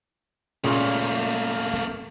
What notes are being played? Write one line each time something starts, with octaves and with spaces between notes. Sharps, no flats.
A#2 C#3 A3 A#3